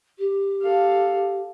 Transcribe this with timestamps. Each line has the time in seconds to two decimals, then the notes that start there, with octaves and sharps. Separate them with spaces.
0.18 G4
0.61 A4 F5